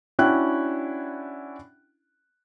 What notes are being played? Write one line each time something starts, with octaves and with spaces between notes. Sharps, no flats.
C#4 D4 E4 F#4 G5 F#6